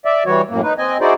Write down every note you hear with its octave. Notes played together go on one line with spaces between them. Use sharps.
D5 E5
E3 G3 F#4 C#5
F#2 A2 A#3
D#4 B4
C4 D#5 G#5
D#4 E4 F#4 G#4 C5 D5